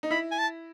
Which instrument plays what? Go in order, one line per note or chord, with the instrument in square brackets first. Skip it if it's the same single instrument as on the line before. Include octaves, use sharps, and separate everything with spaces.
[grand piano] D#4
[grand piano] E4 [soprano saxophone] B5
[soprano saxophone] G#5
A5